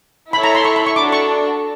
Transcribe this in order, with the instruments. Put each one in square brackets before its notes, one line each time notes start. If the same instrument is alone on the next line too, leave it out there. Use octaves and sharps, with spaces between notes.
[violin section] E4 A4 C#5 E5 [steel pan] B5
[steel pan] A#5
C6
C#6
B5
C#6
[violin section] D4 F#4 A4 [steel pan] D6
[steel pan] C#6